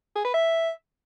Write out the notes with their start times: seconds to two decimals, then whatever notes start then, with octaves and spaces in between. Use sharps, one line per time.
0.16 G#4
0.25 B4
0.34 E5